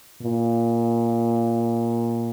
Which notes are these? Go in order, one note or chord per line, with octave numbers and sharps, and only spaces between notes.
A#2